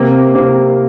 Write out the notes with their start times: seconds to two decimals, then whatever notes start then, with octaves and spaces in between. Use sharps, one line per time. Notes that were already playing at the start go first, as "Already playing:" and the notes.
Already playing: C3 A#3 C4
0.34 C3 A#3 C4